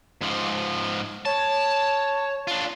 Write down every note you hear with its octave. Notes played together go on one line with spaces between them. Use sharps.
G#2 F3
C#5 A5
D4 F4